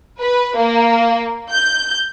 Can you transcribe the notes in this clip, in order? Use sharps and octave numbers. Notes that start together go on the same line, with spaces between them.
B4
A#3
G6